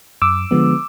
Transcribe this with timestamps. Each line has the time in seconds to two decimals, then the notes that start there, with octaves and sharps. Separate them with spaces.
0.22 F#2 D6 E6
0.51 D3 F3 G#3 B3